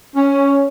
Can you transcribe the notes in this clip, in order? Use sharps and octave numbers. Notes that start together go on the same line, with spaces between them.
C#4